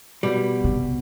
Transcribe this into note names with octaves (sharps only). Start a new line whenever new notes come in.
B2 G3
C3